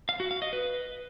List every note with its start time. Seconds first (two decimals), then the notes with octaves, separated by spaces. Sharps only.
0.09 F5
0.20 F#4
0.31 F5
0.42 D#5
0.53 B4